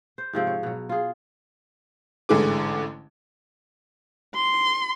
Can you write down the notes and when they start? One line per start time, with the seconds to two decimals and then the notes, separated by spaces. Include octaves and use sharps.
0.18 C5
0.33 G#2 C3 F3 C4
0.47 C#5
0.63 B2 F#3
0.89 F4 G#4
2.29 A1 G#2 D3 E3 G#4 D6
4.35 C6